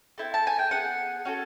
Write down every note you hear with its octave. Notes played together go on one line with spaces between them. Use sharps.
C4 E4 A4
A5
G#5
G5
B3 D#4 G#4 F#5
C#4 F#4 A4